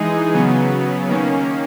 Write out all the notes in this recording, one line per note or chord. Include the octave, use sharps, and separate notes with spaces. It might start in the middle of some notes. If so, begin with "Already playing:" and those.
Already playing: E3 G#3 D#4 G#4
C#3 F#3 B3
D#3 A#3 C#4